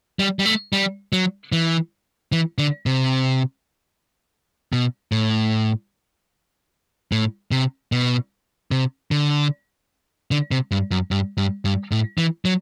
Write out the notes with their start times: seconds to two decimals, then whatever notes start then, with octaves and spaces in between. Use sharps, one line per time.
0.19 G3
0.39 G3
0.46 A3
0.73 G3
1.13 F#3
1.52 E3
2.32 E3
2.58 D3
2.86 C3
4.73 B2
5.12 A2
7.12 A2
7.51 C3
7.92 B2
8.71 C3
9.11 D3
10.31 D3
10.51 C3
10.72 G2
10.91 F#2
11.11 G2
11.38 G2
11.65 G2
11.92 A2
12.18 E3
12.45 F#3